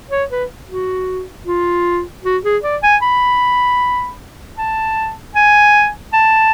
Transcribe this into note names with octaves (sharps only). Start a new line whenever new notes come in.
C#5
B4
F#4
F4
F#4
G#4
D5
G#5
B5
A5
G#5
A5